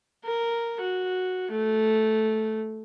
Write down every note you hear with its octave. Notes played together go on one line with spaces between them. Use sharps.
A#4
F#4
A3